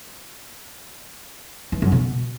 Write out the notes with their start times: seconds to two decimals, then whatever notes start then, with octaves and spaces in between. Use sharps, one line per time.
1.72 E3
1.82 F#2
1.92 B2